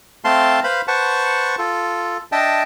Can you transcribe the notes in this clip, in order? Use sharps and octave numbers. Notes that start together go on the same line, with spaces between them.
A3 C4 F5 A5 C6
B4 C5 F5 B5
B4 C5 F#5 A5 C#6
F4 A4
D4 D#5 E5 G5 A5